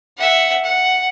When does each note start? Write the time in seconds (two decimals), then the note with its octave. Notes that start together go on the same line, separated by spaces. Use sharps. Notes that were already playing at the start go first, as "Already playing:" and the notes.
0.18 E5 F#5
0.64 F#5